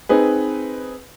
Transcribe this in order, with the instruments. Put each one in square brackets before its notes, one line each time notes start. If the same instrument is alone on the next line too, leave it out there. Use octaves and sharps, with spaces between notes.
[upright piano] C4 D#4 G#4 B4